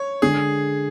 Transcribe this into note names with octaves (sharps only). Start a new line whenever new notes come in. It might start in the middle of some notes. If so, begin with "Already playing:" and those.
Already playing: C#5
D3 G#3 G#4